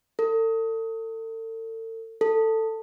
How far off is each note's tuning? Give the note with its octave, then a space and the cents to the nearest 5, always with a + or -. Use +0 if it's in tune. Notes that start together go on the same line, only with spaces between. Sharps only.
A4 +40
A4 +15